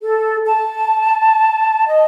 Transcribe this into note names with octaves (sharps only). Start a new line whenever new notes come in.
A4
A5
D#5